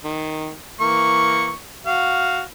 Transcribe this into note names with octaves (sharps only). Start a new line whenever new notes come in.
D#3
E3 A#3 C#6
F#4 F5